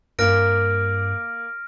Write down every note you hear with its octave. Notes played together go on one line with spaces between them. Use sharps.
G2 A#3 F6 A#6 D7